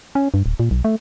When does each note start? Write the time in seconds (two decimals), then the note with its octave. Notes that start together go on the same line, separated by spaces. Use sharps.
0.15 C#4
0.34 G2
0.46 D1
0.60 A#2
0.71 B1
0.85 A3